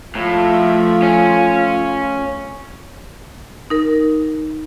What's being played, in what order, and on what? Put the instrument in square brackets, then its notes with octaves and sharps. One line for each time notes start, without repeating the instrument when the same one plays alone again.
[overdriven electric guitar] A2 [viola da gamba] F3 A3 [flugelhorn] F4
[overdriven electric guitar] C#4
[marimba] D#4 A#4